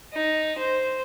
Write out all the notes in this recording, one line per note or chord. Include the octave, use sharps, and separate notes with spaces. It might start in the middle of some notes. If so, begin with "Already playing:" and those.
D#4
C5